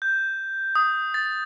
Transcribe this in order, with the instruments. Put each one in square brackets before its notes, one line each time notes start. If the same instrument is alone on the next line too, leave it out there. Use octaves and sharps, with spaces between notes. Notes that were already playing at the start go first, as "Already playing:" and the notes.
[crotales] G6
D#6
A6